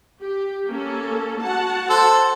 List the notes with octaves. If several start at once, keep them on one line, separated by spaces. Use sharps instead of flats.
G4
A#3 C#4 A4
F#4 F#5 A5
A4 C5